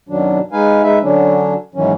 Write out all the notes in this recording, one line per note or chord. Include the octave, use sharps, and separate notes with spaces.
F#2 B2 D#3 F#3 D4
G#3 D#4 B4 F5 G#5
G#3 D#4 B4 E5
D3 F#3 C#4 D4
G#2 B2 D#3 E3 F#3 C#4